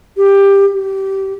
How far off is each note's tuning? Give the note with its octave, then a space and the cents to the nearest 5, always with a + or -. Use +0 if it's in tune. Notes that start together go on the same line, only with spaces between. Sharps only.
G4 +15
G4 -20